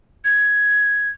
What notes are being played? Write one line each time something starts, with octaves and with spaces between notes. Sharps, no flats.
G#6